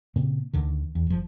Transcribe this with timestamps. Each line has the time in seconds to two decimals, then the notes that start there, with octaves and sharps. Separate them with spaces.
0.16 A#2 C#3 A#3 C4
0.54 D2 D3 D#3
0.95 E2
1.07 F#1 F3